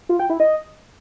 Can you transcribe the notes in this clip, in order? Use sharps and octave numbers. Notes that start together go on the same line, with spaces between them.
F4
G5
E4
D#5